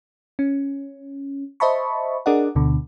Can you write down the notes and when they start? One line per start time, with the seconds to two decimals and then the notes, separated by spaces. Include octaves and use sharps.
0.39 C#4
1.60 C5 D#5 E5 A5 B5 C#6
2.26 D4 G#4 A#4 D5 D#5 F#5
2.55 D2 B2 D3